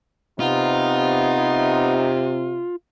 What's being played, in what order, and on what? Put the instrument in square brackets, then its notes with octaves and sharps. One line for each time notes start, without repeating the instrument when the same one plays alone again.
[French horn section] C3 [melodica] B3 [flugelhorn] D#4 [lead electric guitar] F4